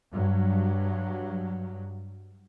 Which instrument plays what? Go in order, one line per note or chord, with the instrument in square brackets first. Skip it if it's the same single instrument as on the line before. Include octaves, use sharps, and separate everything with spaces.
[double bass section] G2 F#3